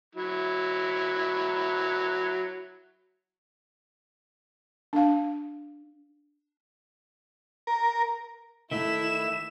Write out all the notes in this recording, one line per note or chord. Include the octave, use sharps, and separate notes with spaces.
F#3 E4
D4 F5
A#4
D#3 A3 E4 E5 E7